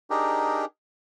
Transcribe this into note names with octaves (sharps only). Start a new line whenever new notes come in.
D4 D#4 G4 G#4 A#4